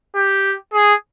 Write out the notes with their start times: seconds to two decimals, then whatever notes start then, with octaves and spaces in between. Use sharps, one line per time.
0.15 G4
0.74 G#4